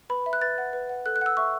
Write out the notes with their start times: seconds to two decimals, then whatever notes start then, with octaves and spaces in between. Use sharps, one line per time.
0.10 B4 B5
0.26 E5
0.33 F#6
0.41 B4 A6
0.58 F#5
0.73 B4
0.89 F#5
1.06 A4 F#6
1.16 F#6
1.21 F#5 E6
1.37 E5 C#6